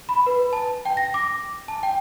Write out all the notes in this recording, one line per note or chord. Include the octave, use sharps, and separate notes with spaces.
B5
B4
A5
G5
A#6
D6
A5
G5